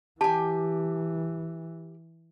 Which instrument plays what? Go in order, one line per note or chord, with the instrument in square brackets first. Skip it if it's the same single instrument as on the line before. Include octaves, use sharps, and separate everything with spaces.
[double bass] E3 [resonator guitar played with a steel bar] G4 G#5 [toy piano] A5